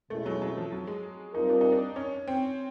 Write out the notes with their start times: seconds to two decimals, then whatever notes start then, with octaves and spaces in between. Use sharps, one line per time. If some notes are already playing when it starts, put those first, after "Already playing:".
0.10 B2 G#3 A3 C#4 E4
0.26 F#3
0.42 F#3
0.57 F3
0.72 F#3
0.87 G#3
1.34 G3 C4 D#4 F4 A#4
1.50 D4
1.61 D#4
1.72 D4
1.96 C#4
2.27 C4